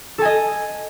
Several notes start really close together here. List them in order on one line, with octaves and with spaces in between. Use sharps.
A4 G#5 D#5